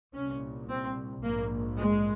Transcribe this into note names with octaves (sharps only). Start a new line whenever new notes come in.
C2 A#2 C#4
C4
A#1 G#2 A#3
G#3